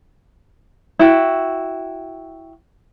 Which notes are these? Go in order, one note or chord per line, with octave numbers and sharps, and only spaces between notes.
E4 F#4 G5